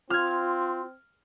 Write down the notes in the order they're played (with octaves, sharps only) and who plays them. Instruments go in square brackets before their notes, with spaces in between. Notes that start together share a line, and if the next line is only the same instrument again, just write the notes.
[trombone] C4 [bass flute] F4 [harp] F6 G#6